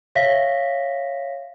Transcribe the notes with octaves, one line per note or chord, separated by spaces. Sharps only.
C#5 E5 F5 A#6 B6